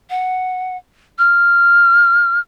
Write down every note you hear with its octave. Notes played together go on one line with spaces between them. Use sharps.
F#5
F6